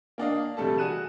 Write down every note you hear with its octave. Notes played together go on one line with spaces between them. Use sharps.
A#3 D4 D#5 F5
E1 C3 G3 A3 A4 A5
F#4 G#4 F#6 D#7 E7